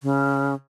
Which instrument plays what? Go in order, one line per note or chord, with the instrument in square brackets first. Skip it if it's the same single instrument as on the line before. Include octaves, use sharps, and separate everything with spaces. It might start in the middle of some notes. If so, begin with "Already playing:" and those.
[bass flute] C#3